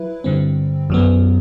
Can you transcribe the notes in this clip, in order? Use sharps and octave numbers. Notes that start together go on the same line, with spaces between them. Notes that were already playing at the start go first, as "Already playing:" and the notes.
Already playing: F#3 E4 B4
G2 D3 G3 C4
F#2 F#3 B3